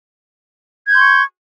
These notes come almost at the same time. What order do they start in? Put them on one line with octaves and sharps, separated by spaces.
G#6 G6 C6 C#6